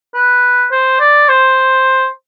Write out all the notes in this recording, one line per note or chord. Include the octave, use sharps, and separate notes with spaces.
B4
C5
D5
C5